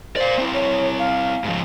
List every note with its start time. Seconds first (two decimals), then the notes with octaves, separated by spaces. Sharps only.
0.16 C5 D5 F5
0.38 C4 E4
0.54 C#5
0.99 F5
1.44 G#2 F3